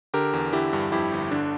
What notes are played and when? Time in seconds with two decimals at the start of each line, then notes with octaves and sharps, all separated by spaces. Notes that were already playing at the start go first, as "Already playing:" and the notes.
0.14 D3 G4 A#4
0.33 E2
0.53 D3 E4 G4
0.73 G2
0.92 F2 E4 G4
1.12 G1
1.31 D3 D4